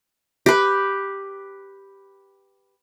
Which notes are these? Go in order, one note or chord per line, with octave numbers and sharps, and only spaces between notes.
G4 B4